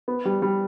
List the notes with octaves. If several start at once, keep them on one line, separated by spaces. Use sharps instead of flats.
B3
G3
G3